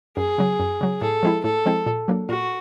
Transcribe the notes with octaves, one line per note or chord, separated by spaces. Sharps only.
F#2 G#4
C#3 F#3
F#2
C#3 F#3
A2 A4
F3 G#3 C4 E4
A2 A4
F3 G#3 C4 E4
A#2
F#3 A#3 D4
A#2 F#4